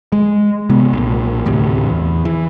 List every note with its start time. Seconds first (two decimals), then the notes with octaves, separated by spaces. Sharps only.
0.12 G#3
0.70 C3 G#3 B3
0.93 B1 A#2
1.46 A1 D2 A2 C3
1.87 E2
2.25 E3